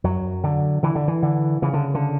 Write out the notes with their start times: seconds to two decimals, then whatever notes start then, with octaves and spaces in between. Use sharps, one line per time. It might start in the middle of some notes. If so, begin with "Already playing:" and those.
0.04 F#2 F#3
0.44 D3
0.83 D3 E3
0.95 D3
1.08 E3
1.23 D3
1.62 C#3 E3
1.73 D3
1.94 D3